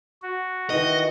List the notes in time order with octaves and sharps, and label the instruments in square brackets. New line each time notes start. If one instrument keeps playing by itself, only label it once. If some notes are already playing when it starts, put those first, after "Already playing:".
[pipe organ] F#4
[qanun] D#3 E3 [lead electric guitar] D#5